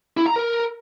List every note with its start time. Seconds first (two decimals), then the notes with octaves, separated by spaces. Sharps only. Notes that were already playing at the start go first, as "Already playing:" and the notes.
0.17 E4
0.27 A#5
0.36 A#4